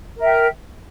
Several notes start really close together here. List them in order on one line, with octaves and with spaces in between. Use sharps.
A#4 E5 G5